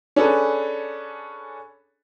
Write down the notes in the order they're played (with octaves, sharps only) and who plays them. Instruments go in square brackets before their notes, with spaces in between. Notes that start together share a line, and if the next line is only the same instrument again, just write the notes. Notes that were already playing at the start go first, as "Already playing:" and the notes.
[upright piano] C#4 D4 G#4 A4 B4